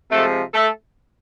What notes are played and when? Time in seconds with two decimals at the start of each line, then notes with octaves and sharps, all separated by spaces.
0.11 C3 F3 G#3 A3 A4
0.54 A3 A4